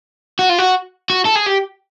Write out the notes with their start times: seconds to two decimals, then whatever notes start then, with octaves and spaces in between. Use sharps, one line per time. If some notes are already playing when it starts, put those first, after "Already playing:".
0.39 F#4
0.49 F4
0.59 F#4
1.10 F#4
1.25 A4
1.36 G#4
1.46 G4